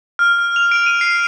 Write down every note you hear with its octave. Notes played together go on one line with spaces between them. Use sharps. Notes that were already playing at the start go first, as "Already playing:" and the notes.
F6
F6
F7
D7
D#7
C7